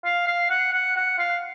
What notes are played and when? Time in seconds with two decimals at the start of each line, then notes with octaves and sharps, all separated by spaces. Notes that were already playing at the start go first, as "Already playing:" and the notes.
0.05 F5
0.27 F5
0.50 F#5
0.72 F#5
0.96 F#5
1.18 F5